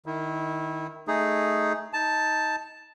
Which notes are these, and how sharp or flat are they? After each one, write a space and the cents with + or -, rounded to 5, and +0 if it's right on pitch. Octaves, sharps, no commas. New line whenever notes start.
D#3 +0 E4 -20
A3 -5 D#4 +0 G#4 +0
D#4 +15 A5 +0